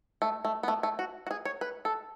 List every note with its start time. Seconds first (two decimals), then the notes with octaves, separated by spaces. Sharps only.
0.22 A3
0.45 A3
0.63 B3
0.68 A3
0.83 A3
0.99 F#4
1.27 F#4
1.31 G#4
1.45 C#5
1.61 B4
1.85 A4